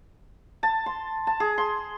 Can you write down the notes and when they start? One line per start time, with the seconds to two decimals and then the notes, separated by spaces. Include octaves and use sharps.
0.63 A5
0.86 C6
1.27 A5
1.40 G#4
1.58 C6